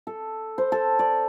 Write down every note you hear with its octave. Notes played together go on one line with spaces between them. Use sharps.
A4
C5
A4
D5